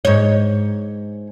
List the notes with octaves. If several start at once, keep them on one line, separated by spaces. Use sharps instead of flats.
G#2 C#5